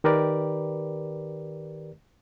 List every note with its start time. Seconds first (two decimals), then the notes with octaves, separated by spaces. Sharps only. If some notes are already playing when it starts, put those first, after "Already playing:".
0.04 D#3 G4 A#4 B4 D5